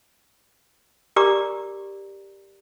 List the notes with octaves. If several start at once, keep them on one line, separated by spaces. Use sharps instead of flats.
G4 A#4 D5 A#5 D6